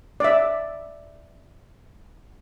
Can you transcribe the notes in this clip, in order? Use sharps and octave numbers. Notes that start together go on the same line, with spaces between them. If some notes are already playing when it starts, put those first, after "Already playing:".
D5 E5